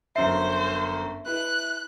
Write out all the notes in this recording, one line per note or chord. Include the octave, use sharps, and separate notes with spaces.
G1 F#2 C5 E5 C7
E4 B4 F#6